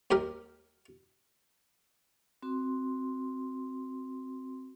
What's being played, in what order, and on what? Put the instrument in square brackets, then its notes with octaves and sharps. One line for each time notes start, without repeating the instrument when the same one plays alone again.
[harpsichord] D#2 G4 A#4
[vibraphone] C4 F#4 C6